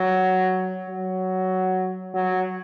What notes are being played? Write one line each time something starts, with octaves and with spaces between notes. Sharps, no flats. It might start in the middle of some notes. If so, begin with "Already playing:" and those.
Already playing: F#3
F#3
F#3